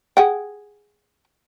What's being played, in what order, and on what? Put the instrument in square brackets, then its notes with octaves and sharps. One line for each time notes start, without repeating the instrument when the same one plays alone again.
[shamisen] G#4 F#5 G5